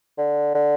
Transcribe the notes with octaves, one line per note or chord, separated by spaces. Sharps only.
D3
D3